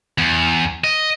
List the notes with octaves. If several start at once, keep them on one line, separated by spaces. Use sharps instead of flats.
E2
D#5